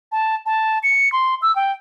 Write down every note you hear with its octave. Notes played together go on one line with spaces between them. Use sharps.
A5
A5
C#7
C6
E6
G5